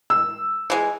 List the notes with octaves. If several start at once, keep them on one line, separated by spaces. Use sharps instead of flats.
E6
E3 G#3